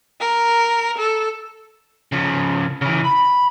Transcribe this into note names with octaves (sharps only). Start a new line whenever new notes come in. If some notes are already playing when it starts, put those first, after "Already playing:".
A#4
A4
C#3 F3
C#3 E3
B5